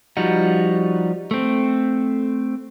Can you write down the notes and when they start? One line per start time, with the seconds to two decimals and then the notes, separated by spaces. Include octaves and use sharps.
0.17 F3 G3 D#4 F#4
1.31 A3 C4